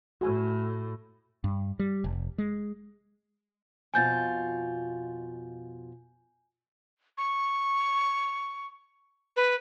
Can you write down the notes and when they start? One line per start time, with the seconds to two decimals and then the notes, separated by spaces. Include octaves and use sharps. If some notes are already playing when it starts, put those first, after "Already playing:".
0.21 A2 F#4 G#5
1.44 G2
1.79 G3
2.04 F1
2.38 G#3
3.94 F2 B2 F4 G#5 G6 A6
7.18 C#6
9.37 B4